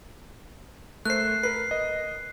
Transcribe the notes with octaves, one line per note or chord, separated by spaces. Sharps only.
A3 A#4 C5 F#6 C7
A#4 B4 C7
D#5